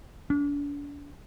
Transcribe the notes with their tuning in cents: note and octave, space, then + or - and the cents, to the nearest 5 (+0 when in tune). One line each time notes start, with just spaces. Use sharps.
D4 -40